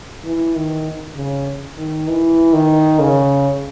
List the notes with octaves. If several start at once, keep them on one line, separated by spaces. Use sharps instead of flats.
E3
D#3
C#3
D#3
E3
D#3
C#3